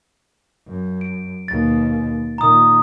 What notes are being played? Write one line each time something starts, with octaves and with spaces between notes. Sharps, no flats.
F#2
D7
D#2 B2 A6
A#2 D#3 A#5 D#6